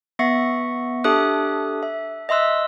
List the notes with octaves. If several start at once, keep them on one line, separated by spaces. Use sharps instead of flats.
B3 E5 C#6 A#6 C#7
D4 G4 A4 E5 D#6 F#6
E5
D#5 E5 C6 E6 F#6